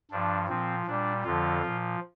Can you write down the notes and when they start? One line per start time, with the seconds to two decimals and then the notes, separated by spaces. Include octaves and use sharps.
0.11 G2 F3 D4
0.49 A#2 F3 C4
0.86 A#2 G3 D4
1.24 F2 D3 F3 F4
1.62 A#2 F3